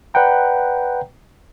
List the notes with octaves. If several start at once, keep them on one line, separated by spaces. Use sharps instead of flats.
B4 D5 F#5 G5 A#5